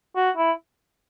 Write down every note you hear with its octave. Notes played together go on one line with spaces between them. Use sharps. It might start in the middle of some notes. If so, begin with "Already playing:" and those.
F#4
E4